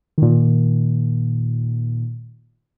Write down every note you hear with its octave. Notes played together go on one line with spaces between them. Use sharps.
A#2 D#3